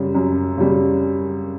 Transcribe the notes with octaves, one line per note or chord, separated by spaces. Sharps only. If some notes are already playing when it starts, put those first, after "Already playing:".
Already playing: F#2 C#3 G3
F#2
C#3 G3